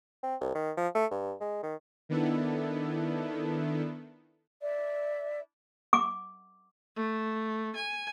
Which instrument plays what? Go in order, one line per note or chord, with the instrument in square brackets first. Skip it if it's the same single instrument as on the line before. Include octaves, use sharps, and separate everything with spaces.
[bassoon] C4
C2
D#3
F3
A3
G2
G#3
D#3
[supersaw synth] D#3 B3 D4 E4 A4
[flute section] D5 E5
[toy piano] D6
[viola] A3
G#5